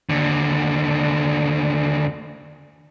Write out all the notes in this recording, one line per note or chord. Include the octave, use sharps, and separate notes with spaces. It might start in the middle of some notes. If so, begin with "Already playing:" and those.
D#2 D3